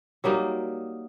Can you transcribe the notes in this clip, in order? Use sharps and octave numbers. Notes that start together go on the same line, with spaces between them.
F#3 G3 A#3 D#4